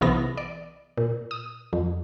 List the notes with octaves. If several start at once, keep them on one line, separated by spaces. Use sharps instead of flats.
B1 C3 E3 B3 A#6
D5
A#2
D#6
F2